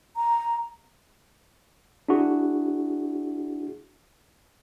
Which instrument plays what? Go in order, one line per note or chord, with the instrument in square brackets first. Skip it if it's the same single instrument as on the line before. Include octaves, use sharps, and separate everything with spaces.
[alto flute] A#5
[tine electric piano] D4 E4 F#4 G#4